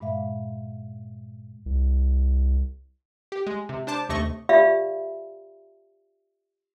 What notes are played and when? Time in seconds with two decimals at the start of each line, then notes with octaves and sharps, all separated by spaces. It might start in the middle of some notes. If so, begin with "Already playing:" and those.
0.01 G2 A#2 G#3 E5 F5
1.66 C2
3.32 G4
3.47 G#3
3.69 C3
3.87 D4 C5 A5 D6
4.09 D#2 C3 A3 D#5 C#6
4.49 F4 G4 D5 E5 F5 B5